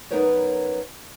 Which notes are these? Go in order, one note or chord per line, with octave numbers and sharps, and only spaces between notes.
F#2 B3 D#4 A#4 B4 C#5